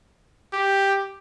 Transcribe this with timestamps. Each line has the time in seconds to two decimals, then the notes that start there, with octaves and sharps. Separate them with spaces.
0.53 G4